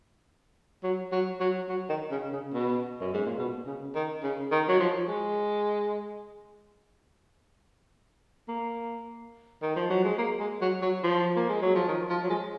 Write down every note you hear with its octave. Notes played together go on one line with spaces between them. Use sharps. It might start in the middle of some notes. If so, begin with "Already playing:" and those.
F#3
F#3
F#3
F#3
D#3
C#3
C#3
B2
F#2
G#2
A#2
B2
C#3
D#3
C#3
D#3
F#3
F3
G#3
A#3
D#3
F3
F#3
G#3
A#3
G#3
F#3
F#3
F3
A#3
G#3
F#3
F3
D#3
F3
F#3
G#3